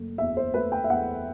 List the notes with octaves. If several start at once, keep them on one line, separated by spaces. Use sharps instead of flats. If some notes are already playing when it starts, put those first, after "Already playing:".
Already playing: F#1 A3
E2 E5
C5
A3 B4
G5
E5
E2 F#5